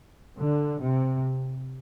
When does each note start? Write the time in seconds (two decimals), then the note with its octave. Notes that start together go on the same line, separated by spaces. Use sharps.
0.38 D3
0.80 C3